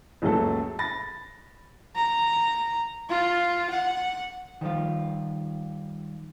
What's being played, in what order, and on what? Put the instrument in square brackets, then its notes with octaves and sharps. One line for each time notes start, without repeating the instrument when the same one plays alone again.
[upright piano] C#2 F#2 A#2 F#3 A3 A4
B5 A6 A#6
[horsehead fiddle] A#5
F4
F#5
[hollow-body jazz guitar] D#3 F3 G3 F4